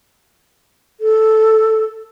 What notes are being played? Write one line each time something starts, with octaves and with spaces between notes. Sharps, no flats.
A4